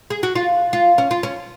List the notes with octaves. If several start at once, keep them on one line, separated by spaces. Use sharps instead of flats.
G#4
F#4
F4
F4
C#4
F4
C#4